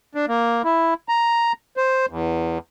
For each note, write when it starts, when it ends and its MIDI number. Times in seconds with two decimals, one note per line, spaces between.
0.15 0.26 62
0.28 0.62 58
0.64 0.94 64
1.09 1.52 82
1.77 2.06 72
2.09 2.58 40